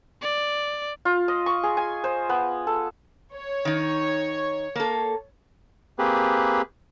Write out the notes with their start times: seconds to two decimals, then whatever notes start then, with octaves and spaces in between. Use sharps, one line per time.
0.22 D5
1.05 F4
1.28 D#5
1.46 C#6
1.63 G#4
1.77 G#5
2.04 C5
2.29 B3
2.67 A4
3.33 C#5
3.65 D#3 D#4
4.76 A#3 A4
5.99 A#3 C4 G4 G#4 B4